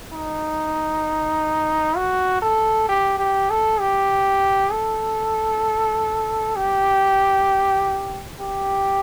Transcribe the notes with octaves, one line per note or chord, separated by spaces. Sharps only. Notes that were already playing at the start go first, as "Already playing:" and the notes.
D#4
F#4
A4
G4
G4
A4
G4
A4
G4
G4